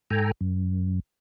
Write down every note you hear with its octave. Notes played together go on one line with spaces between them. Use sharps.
G#2 A4 G5 G#5 A#5
F#2